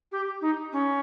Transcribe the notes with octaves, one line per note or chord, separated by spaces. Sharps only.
G4
D#4
C#4